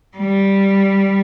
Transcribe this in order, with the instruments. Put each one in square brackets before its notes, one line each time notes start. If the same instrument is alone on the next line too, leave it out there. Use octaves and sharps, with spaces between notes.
[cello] G3